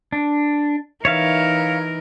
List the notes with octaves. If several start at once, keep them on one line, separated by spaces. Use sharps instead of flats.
D4
E3 D#4 A#4 C#5 E5 F5